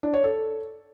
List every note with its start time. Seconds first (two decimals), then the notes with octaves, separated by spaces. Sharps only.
0.03 D4
0.13 C#5
0.24 A4